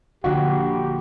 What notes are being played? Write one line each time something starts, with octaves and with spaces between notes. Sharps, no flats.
A#1 A#2 D3 F#4 G4